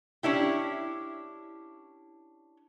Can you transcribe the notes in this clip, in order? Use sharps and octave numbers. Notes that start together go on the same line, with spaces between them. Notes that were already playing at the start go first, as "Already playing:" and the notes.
C#4 D4 E4 G4